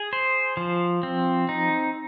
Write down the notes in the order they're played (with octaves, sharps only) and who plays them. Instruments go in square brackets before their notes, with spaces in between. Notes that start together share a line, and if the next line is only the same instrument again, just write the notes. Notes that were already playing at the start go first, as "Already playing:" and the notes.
Already playing: [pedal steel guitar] G#4
C5
F3
C4
D#4